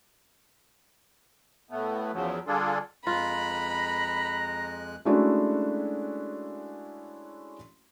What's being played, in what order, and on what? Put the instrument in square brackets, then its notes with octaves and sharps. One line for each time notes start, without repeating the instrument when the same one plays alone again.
[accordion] A2 A3 B3
E2 C#3 F3 F#3
D3 G3 D4 F4 G#4 A4
[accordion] F2 G#3 F#6 [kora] F4 [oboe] A#5 [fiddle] B5
[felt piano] G#3 A3 C#4 D4 E4 F#4